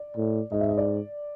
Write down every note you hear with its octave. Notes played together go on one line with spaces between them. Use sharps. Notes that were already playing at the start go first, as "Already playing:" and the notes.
Already playing: D5
A2
G#2 D#5
E5
D#5
D5